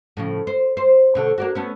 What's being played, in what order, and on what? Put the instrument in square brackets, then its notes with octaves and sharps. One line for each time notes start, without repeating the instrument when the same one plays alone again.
[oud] A2 C#3 F3
C5
C5
B2 D3 A3
A#3 D4 F#4
A3 B3 C#4